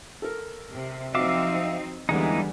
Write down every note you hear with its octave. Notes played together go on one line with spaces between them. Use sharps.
A4 A#4
C3
F3 F#3 C4 D#4 E5 F5 D6
E2 D3 E3 G3 G#3 A#3 B3 D#4